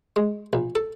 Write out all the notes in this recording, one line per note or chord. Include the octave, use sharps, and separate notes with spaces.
G#3
A#1
A4